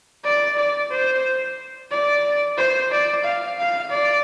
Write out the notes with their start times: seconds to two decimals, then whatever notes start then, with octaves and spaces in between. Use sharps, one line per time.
0.24 D5
0.57 D5
0.91 C5
1.91 D5
2.58 C5
2.91 D5
3.24 F5
3.58 F5
3.91 D5